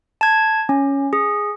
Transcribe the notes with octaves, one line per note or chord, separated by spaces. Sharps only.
A5 G#6
C#4
G#4